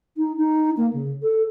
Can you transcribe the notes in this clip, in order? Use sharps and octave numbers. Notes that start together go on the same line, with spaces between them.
D#4
D#4
A#3
C#3
A4